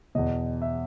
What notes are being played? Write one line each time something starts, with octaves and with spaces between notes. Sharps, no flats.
E2 B2 D#5
E5